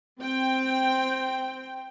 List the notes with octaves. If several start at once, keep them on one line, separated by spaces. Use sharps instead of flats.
C4 G5